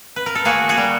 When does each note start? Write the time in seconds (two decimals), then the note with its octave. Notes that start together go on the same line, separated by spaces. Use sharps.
0.16 B4
0.26 A#4
0.35 A4
0.45 A#3 F#4 G#4
0.69 F#4 G#4
0.77 G3